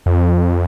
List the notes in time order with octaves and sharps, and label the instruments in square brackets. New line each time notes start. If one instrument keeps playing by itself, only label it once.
[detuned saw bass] F2